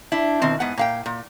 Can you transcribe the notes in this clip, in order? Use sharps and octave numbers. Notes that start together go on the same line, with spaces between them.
D4 E4
B2 D#3 C4
G#2 B3 F#5
A#2 F5 G5
A#2